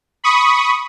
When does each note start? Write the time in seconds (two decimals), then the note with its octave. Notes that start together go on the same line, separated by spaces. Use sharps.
0.24 B5 C#6 D#6